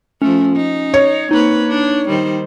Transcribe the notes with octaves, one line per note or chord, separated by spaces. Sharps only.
F3 A3 C#4
D#4
C#5
A#3 C4 D#4 B4
D4
D#3 G3 C5